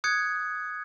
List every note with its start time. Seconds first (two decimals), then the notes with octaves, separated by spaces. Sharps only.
0.04 D#6 F#6 G#6 C#7